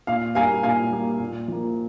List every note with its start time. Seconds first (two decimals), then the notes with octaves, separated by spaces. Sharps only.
0.07 A#2 F5
0.35 G3 A#3 F5 G#5
0.63 A#2 F5 G#5
0.91 G3 A#3
1.20 A#2
1.48 F3 A#3